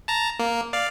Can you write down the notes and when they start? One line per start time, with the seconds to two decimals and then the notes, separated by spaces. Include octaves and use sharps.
0.08 A5 A#5
0.39 A#3
0.73 D5 F5